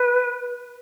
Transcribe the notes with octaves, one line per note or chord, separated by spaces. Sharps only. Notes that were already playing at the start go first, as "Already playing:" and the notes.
Already playing: B4